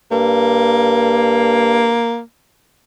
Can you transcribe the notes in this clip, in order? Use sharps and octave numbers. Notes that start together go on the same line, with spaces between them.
G2 A#3